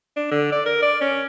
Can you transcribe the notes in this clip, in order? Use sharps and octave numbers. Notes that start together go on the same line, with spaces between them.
D4
D3
D5
A#4
D5
C#4